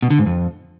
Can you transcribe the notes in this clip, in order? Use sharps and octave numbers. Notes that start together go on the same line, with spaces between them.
B2
D3
G#2
F2